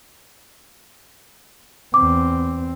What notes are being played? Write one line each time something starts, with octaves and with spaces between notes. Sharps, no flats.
E2 C4 D6